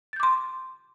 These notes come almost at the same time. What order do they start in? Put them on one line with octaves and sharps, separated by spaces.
A6 G6 D6 C6